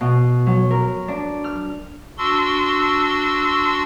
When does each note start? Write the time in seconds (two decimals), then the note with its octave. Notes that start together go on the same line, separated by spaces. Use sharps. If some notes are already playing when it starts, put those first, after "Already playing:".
0.01 B2
0.46 F#3
0.71 A#4
1.08 D4
1.44 F6
2.18 D4 F#4 C6 E6